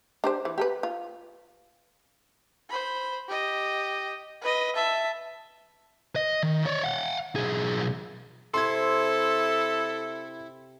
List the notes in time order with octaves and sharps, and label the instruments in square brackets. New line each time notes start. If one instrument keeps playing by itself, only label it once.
[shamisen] D4 G4 C5
E3
G4 A4 B4
F4
[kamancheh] C5 B5
G4 D#5
B4 D#5
E5 A5
[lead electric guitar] D#5
D#3
C#5 D5
F5 F#5
B1 G#4
[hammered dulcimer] C3 C5 C#6 [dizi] E4 [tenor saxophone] A4 [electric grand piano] C6 G#6